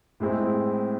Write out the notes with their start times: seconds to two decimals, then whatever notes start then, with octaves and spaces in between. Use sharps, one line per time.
0.20 A2 G#3 C4 E4